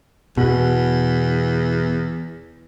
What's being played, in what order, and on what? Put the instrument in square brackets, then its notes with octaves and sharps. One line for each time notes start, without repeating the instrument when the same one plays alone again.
[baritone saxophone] E2 [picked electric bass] B2